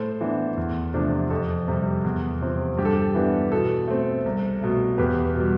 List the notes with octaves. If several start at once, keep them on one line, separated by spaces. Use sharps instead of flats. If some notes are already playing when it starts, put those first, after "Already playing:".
Already playing: A2 A4 C5
E3 B3 D4
E2
C3 F3 A3 D4
F2 A4
C3 G3
E2
C3 F3 C4
G2 G4
A4
G4
E3 B3 D4
B2 A4
A3 C4
C2
B2 A3
E2 G4 B4
B2 G3